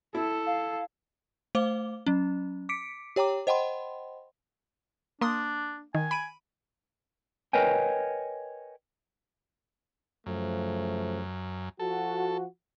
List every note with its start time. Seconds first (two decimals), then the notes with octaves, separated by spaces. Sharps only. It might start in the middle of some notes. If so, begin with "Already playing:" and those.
0.15 E4 A4
0.46 F5
1.55 A3 C5 F5 D6 G7
2.06 F#3 C#4
2.69 D6 B6 C#7 D7
3.16 G4 C#5 G5 A#5 D6
3.47 C5 D#5 F#5 G5 B5 C6
5.21 A#3 D4 C6 D#6
5.95 D#3 G#5
6.11 B5 D7 D#7
7.53 A#4 B4 C#5 D#5 G5 G#5
10.26 F#2 C#3 F3 A3
11.79 F3 F#4 A4